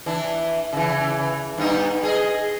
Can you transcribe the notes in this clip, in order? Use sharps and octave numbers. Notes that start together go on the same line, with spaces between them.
E3 D4
C#3 E3
G2 B3 D#4
G#4 A4 D#5